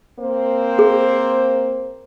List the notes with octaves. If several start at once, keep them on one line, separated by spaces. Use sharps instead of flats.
A#3 C4 C5
G#4